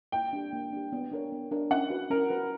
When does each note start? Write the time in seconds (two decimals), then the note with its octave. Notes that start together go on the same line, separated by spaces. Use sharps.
0.12 A#3 G5
0.33 D4 G4
0.53 A#3
0.73 D4 G4
0.93 B3
1.12 D4 A#4 C#5
1.32 B3
1.51 D4 A#4 C#5
1.71 C#4 F#5
1.90 F#4 B4
2.11 C#4 A#4
2.30 F#4 B4